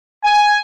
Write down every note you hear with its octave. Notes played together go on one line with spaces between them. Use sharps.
G#5